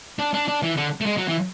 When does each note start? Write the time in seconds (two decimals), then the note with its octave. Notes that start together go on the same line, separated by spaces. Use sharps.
0.19 D4
0.34 D4
0.48 D4
0.63 E3
0.77 D3
1.01 A3
1.06 G#3
1.17 F#3
1.28 E3